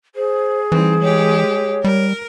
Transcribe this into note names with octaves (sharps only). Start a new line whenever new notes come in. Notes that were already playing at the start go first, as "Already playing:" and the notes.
G#4 C5
E3 G3 C4 D#4
G#3 G4 C#5
G3 A#4